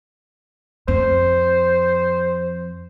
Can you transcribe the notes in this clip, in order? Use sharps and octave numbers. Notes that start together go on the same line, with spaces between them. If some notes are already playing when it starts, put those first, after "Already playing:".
F2 C5